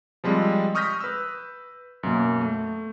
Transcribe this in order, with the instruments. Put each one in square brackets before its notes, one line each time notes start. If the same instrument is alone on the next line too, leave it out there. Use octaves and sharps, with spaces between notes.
[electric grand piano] F3 G3 G#3 C4
C#6 D#6 F6 G6 A#6 B6
B4 E6
F#2 B2 A#3
A3